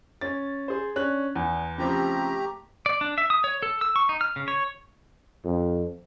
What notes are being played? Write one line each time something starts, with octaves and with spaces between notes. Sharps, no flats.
C#4 A6
G#4 C5
C#4 D4 F#6
E2
C#3 F3 A3 C4 G4 A#5
D5
D4
E5
D#6
C#5
A4
E6
C#6
D#4
F6
C#3
C#5
F2